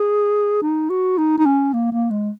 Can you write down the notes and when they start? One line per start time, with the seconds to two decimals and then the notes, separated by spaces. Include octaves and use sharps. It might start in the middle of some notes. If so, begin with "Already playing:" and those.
Already playing: G#4
0.62 D#4
0.90 F#4
1.18 D#4
1.38 D#4
1.46 C#4
1.73 A#3
1.92 A#3
2.11 G#3